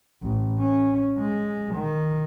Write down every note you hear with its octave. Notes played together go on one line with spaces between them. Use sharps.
A1
C#4
G#3
D#3